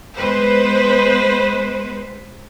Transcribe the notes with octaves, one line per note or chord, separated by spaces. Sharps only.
G#3 B3 B4 C5